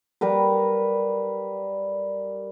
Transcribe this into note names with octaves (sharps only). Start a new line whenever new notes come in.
G3 A#4 B4